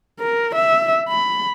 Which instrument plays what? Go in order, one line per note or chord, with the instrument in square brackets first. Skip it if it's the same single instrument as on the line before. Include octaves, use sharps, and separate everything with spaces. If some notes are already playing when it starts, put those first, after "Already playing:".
[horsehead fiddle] A#4
E5
B5